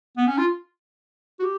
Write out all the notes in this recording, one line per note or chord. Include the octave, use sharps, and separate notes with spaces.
B3
C#4
F4
F#4
G4